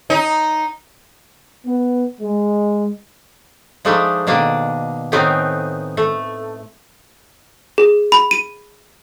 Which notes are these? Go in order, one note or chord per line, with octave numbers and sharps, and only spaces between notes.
D#4
B3
G#3
F3 G#3 A3 D4 D#4
B2 D#3 A#3 D4
A2 D#3 B3 C4 D#4 G#5
A3
G#4
B5
D#7